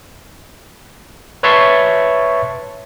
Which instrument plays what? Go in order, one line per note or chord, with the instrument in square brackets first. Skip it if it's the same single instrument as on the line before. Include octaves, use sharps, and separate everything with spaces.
[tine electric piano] B4 C#5 E5 A5 C6 C#6